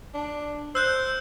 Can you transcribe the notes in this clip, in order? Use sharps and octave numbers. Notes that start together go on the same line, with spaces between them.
D4
C5 E6 F#6 G6